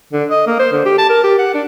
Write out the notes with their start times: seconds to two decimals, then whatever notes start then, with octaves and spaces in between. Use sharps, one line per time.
0.13 D3
0.31 D#5
0.47 A#3
0.59 C5
0.72 D3
0.85 G4
0.98 A5
1.09 A#4
1.24 G4
1.39 F#5
1.54 D4